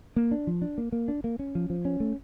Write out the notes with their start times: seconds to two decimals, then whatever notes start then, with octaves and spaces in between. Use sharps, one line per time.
0.16 A#3
0.31 D4
0.47 F3
0.62 D4
0.78 A#3
0.92 A#3
1.08 D4
1.24 A#3
1.39 C#4
1.55 F3
1.70 F3
1.85 C#4
2.00 A3